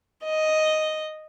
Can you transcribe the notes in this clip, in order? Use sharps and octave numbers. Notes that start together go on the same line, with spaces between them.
D#5